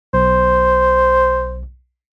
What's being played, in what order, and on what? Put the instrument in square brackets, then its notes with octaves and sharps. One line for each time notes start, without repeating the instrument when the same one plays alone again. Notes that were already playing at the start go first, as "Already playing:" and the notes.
[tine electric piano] B1 [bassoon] C5